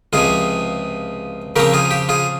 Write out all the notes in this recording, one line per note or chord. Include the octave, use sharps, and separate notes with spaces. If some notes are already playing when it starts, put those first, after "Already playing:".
C#2 C3 F3 F4 G#4
C#3 F3 C4 G4 A#4
F4 G#4
G4
F4 G#4